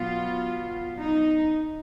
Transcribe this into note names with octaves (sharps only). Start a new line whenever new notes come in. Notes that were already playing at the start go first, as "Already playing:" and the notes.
Already playing: B2 F#3 B3 F4
D#4